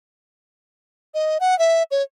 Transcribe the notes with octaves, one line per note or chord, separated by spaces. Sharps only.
D#5
F#5
E5
C#5